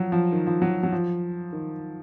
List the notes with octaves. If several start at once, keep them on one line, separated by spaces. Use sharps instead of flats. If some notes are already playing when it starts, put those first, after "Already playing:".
Already playing: F3 F#3
F3
D#3
F3
F#3
F#3
F3
D#3